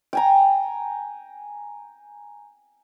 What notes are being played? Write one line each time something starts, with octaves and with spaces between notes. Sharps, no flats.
G5 G#5 A#5